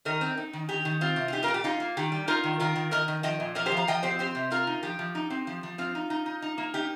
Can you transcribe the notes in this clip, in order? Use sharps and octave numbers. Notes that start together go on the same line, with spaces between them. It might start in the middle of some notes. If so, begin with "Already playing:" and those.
D#3 A#4 D#5
C4
D#4
D#3
D#3 G4
D#3
C4 F4
C3
F4
D#4 G4
F4 A#4
A#2
G4
D#4 F4
A#3
D#3 G4
G3
D#4 F4 A#4
D#3
D#3 F4 A#4
D#3
D#3 A#4 D#5
D#3
F3 D#5 G5
A#2
F3 A#4 D#5
G4 C5
F3
F5 A#5
F3 D#5 G5
C4 G4 C5
C4 G4 C5
C3
C4 F4 A#4
D#4
F3 G4
F3
D#4
C4
F3
F3
C4 F4
D#4
D#4
D#4
D#4
A#3
D#4 G4